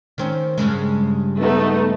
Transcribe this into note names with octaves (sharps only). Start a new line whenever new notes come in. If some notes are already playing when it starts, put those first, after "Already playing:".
D#3 C4 C#4
G2 C#3 G#3
A3 B3 D#4